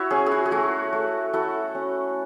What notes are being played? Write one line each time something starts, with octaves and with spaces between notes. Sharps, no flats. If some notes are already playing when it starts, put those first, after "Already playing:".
Already playing: E4 F#4 C#5 E5
C#4 G#4
G#4
F#4
G#4
A3 F#4
A3
E4 F#4 A4
C#4